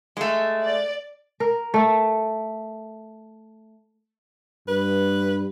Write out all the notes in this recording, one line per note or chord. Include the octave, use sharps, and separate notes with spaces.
G#3 A3
D5
A#4
A3
G2 B4